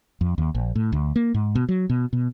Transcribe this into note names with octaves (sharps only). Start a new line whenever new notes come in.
F2
D#2
A#1
A2
D2
A#3
G#2
B2
F#3
B2
B2